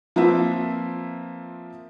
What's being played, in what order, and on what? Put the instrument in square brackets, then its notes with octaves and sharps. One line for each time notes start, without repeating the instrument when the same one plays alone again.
[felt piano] F3 A#3 C4 F4 B4 E5